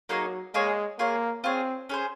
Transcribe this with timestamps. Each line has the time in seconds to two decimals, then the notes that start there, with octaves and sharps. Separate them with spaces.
0.09 F#3 A#3 D#4 G#4 C#5
0.54 G#3 A#3 D#4 G#4 C#5
0.99 A#3 F4 G#4 C#5
1.44 C4 F4 G#4 C#5
1.89 C#4 G#4 C5